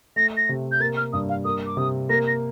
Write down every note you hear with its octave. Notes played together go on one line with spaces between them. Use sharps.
A3 A#6
A#6
C3
G6
A#3 A6
F6
G2 D#6
F5
A#3 D#6
D6
C3 D#6
A#3 A#6
A#6